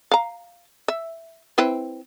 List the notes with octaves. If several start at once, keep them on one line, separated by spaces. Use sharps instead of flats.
F5 A#5
E5
C4 E4 B4